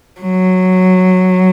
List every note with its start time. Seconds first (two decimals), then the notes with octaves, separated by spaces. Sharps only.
0.21 F#3